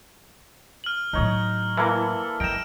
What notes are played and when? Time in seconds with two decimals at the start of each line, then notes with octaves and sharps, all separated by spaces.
0.84 F6 F#7
1.13 A2 F#3 D#4 C#5 D#6
1.77 E3 A#3 E4 A4 D5
2.40 F#1 D#5 G5 A#5 D7 E7